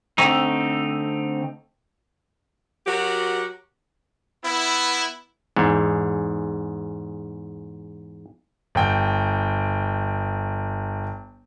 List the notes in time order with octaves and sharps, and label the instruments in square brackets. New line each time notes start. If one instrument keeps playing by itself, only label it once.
[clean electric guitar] D3 A3 C4 D#4
[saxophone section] F#3 F#4 G4 A#4
[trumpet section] B3 E4
[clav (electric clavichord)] E2 G#2
[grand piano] G1 G5